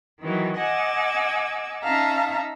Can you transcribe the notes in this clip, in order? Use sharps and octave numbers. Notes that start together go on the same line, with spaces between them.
D#3 E3 F#3
D#5 F#5 G#5 D6 E6
C#4 D#4 E5 F5 A5 A#5